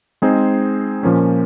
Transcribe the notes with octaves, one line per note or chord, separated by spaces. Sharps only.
G#3 C4 D#4 G#4 C5
A#2 F3 A#3 C#4